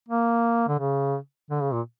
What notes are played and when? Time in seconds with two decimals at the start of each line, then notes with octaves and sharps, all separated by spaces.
0.08 A#3
0.68 D3
0.79 C#3
1.50 D3
1.61 C#3
1.73 A#2